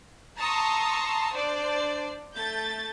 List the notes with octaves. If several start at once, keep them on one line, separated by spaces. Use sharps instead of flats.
A5 A#5 C6 C#6 D#6 E6
D4 C5 D5
A3 G6 A6